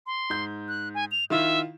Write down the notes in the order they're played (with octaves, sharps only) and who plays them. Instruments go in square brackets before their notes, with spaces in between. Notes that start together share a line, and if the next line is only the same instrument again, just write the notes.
[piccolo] C6
[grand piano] G#2 G6
[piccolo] F#6
G#5
F7
[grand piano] D#3 E4 F4 [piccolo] E5